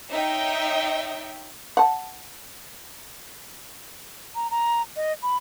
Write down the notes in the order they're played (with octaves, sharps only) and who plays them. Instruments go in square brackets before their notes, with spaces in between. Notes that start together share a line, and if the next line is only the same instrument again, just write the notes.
[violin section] D#4 C#5 D#5 E5 G5
[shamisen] F#5 A5
[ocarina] A#5
A#5
D#5
B5